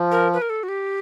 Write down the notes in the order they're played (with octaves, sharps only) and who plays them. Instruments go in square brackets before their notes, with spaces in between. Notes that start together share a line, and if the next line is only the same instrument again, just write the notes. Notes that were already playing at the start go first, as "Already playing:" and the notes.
Already playing: [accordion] F3
[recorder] A#4
B4
A#4
A4
F#4
G4